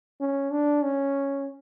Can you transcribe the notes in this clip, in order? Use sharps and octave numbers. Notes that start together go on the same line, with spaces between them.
C#4
D4
C#4